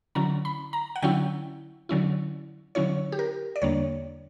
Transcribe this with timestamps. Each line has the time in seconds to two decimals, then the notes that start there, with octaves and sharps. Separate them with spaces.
0.15 D3 F#3 C#4 E4 A#5
0.45 B5
0.73 A#5
0.96 F#5
1.02 D3 F#3 C#4 E4 G5
1.89 D3 F#3 C#4 E4
2.75 D3 F#3 C#4 E4 C#5
3.12 G4
3.19 A#4
3.56 D5
3.62 E2 D3 G3 A#3 D4 C#5